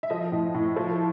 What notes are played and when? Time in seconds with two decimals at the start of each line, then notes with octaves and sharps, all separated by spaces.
0.03 E5
0.10 F3 D#5
0.32 A2
0.54 A2
0.76 F3